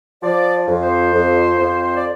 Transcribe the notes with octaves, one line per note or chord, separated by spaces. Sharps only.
F3 D5
F2
C5
F2
F2
D5